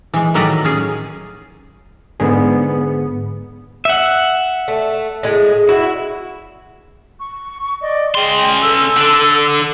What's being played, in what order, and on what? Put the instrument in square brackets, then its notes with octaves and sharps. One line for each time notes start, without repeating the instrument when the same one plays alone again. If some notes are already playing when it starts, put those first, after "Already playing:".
[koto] E3 G#3
A2 D#3 F#3 B4 D5 A#5
C#4 G#4
[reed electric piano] G#2 D3 G#4 [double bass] B3
[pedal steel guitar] E5 F#5
[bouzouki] A3
A2 G#3 G#4
[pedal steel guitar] E4 [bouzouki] F#4
[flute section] C#6
D5 D#5
[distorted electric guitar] C#4 C6 [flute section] G#4 D#5 G5
[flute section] A4 E6
[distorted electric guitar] D3